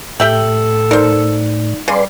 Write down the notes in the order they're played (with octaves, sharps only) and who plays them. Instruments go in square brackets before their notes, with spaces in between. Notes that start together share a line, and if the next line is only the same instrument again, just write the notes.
[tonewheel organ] A2 [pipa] G4 E5 G5 [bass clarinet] A4 [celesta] F#7
[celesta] D#4 D5 C#7 [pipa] A#4 C5
[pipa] C#3 [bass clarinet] G3 [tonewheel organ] B4 D5 C6